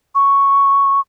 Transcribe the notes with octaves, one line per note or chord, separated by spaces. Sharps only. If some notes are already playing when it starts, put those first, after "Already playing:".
C#6